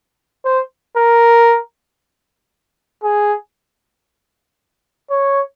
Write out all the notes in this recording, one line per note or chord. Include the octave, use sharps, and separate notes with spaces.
C5
A#4
G#4
C#5